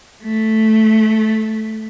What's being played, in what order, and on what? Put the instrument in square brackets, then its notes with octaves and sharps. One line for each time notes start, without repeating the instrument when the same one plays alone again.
[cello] A3